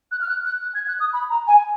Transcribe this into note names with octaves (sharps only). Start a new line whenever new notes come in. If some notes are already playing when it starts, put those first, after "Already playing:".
F#6
F6
F#6
F#6
F#6
G#6
F#6
D#6
B5
A#5
G#5